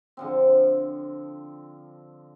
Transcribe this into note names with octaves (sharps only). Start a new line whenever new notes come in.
D3 F3 C4